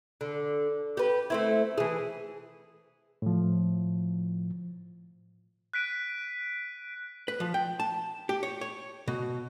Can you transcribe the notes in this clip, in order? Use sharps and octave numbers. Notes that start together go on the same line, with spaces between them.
D3
G4 B4
A3 C4 E4
E3 G#4
A2 F3
F#6 B6 D7 D#7
B4
F3
G5
A5
G4
C#5
C#5
B2